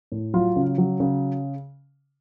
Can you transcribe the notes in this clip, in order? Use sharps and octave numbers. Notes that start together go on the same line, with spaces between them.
A2
F#3 F4
C#3
F#3
C#3